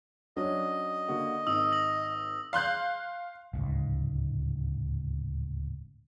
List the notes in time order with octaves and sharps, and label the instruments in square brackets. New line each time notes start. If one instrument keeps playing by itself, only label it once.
[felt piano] F#3 C#4 D4 [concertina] D#5
[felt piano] D3 A#3 F#4
[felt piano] G#1 [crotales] D#6 E6 F#7
[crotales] A#6 F#7
[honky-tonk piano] F5 C6 F#6 G6
[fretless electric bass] D1 C#2 G#2